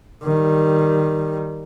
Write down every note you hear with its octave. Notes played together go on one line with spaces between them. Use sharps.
D#3 G3